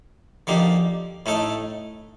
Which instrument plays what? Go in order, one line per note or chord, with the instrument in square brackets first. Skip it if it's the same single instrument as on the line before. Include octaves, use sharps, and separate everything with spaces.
[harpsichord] D3 F3 A#3 D#4 G4
A2 A3 D#4 A4